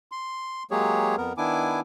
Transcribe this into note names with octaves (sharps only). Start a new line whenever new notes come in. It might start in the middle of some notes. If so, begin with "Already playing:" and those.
C6
F#3 G#3 A#3 G4 G#4 C#5
F2 B3 A#4
D#3 B3 D4 E4 G#5 D6